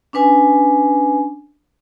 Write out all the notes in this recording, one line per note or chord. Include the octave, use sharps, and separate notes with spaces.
C#4 D4 B4 G#5